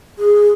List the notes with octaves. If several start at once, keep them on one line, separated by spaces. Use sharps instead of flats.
G#4